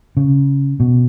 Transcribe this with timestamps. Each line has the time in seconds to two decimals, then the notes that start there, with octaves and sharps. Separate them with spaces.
0.17 C#3
0.80 B2